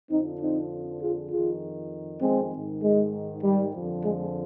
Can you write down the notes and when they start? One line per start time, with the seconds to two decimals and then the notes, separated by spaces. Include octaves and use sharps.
0.11 F2 D3 F3 C4 D#4
0.41 C4 D#4
1.01 F4 G#4
1.31 F2 D#3 F4 G#4
2.22 G#3 C4
2.53 G#2 D#3
2.83 G#3
3.44 G3
3.73 F2 D3 F3
4.03 G#3